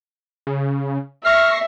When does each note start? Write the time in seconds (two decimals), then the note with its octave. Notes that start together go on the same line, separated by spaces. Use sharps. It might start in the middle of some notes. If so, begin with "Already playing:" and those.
0.47 C#3
1.25 E5 C#6 F6 A#6 C7